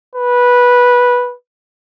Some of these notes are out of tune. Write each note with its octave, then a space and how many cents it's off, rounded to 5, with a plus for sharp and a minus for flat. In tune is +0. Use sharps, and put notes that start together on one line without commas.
B4 -10